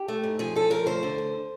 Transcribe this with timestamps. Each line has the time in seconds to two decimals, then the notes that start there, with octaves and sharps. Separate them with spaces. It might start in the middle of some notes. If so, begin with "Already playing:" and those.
Already playing: G4
0.08 A3
0.24 G#2
0.39 F3 G#4
0.56 D2 A4
0.70 F3 A#4
0.86 D2 C5
1.03 D3
1.18 D2